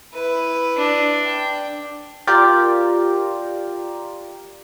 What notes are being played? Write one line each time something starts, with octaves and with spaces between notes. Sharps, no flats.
E4 B4
D4
G5
F4 G4 A#4 D5